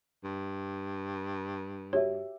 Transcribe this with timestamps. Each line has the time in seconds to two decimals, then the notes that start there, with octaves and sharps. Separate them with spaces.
0.24 G2
1.93 F#4 G4 C#5 E5